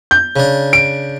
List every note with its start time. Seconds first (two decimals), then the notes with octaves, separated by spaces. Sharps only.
0.11 G6
0.36 C#3 D4
0.73 D7